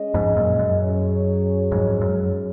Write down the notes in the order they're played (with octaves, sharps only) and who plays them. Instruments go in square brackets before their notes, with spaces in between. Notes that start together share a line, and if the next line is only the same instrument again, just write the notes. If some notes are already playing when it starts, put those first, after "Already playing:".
Already playing: [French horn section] G#3 C#4 G#4 D#5
[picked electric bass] F2 G#2
F#2 A#2
F#2
[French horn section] F#3 C#4 G#4 C#5
[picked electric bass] F2 G#2
F#2